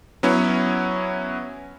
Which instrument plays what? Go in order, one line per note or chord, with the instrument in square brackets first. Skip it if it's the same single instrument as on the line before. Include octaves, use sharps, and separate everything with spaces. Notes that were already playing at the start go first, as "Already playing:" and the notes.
[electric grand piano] F#3 B3 C#4 E4